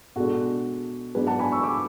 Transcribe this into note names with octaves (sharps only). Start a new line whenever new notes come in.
B2 G#3 D4 F#4 A4
G#2 F#3 B3 D4 G#4 B4
F#5 A5
G#5 B5
C#6 E6
B5 D6